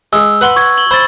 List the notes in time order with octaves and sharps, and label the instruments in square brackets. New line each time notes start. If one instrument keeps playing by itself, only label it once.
[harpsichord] G#3 [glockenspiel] E6
[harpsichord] B4 F#5 C6
[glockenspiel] C#6 G#6
F#7 G7
[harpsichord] C5 [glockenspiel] B5 E6 A6